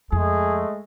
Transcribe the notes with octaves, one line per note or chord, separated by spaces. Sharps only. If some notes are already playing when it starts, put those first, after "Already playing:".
F2 G#3 A3 G#4